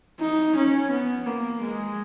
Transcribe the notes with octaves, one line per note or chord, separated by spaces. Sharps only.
D#4
C#4
B3
A#3
G#3